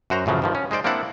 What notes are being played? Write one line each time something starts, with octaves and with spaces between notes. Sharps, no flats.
F#2 F#4 C5 A#5
A1 F#2 C#3 F3 F#3
G2 D#3 F3
C#4
G#3 D#4 C5 D5
A#3 C4 D4 E4 D5 F#5